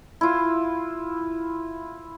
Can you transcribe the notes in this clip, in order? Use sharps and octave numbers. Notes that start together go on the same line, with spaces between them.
E4 F4